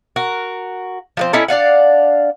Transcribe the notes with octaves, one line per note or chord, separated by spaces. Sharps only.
F#4 A#4
F3 G#3 C4
C#4 D#4 E4 A4
D4 D5 F5 F#5